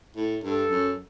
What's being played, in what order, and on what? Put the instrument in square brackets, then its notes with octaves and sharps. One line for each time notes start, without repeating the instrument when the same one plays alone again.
[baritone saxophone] A2
[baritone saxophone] G2 [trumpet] A4
[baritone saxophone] F#2